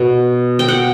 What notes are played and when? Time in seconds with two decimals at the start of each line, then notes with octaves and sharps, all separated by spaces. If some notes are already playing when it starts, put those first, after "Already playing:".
Already playing: B2
0.59 G5
0.68 F#5